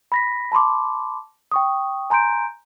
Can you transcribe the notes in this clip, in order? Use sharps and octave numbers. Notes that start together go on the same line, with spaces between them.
B5 A#6 B6
A5 B5 C6 D6
G5 C#6 D#6
G#5 A#5 C6 G6 D7